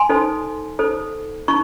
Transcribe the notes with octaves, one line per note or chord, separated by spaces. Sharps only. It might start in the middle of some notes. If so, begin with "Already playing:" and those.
Already playing: G#5 C6
D#4 A4 C5
D#4 A4 C5
D#4 C#6